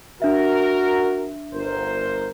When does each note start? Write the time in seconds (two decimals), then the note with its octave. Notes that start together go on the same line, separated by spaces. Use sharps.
0.22 D4 F#4 A#4 E5
1.53 G1 A#4 C5